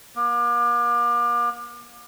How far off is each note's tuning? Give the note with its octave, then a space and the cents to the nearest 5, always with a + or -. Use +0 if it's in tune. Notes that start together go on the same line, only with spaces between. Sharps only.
A#3 +40